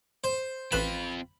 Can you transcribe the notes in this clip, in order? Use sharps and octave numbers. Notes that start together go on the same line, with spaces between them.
C5
A1 C4 F4 B4 B5 E7